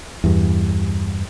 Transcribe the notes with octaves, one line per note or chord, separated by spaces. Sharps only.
E2 G2